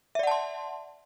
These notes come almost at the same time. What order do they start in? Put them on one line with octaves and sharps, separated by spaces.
E5 D5 F#5 A5 C6